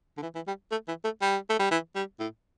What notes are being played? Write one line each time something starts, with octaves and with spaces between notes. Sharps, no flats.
D3
E3
E3
G3
A3
E3
A3
G3
A3
G3
E3
G3
A2